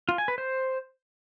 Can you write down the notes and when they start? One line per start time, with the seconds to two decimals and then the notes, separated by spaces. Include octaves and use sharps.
0.09 F4
0.18 G#5
0.28 B4
0.38 C5